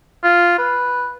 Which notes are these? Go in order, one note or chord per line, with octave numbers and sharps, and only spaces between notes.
F4
B4